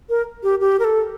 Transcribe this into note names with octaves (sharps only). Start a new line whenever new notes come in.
A#4
G4
G4
A#4
A4